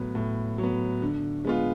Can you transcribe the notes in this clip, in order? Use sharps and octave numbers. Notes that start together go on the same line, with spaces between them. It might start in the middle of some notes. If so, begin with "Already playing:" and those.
Already playing: A2 F#3 B3
A2
F#3
B3
D3
G#3 B3 F4